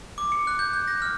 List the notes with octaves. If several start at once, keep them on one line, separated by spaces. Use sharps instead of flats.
D6
C#7
F#6
G6
G6
A#6
F6